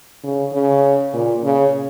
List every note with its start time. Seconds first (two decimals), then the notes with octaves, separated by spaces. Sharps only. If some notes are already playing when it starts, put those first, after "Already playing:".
0.24 C#3
0.53 C#3
1.13 A#2
1.43 C#3